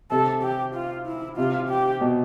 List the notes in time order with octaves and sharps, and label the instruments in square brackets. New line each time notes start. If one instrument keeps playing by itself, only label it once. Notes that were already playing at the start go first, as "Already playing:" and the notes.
[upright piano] C3 [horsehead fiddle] A4
[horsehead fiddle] G4
F4
E4
[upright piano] C3 [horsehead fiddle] F4
[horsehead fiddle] G4
[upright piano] B2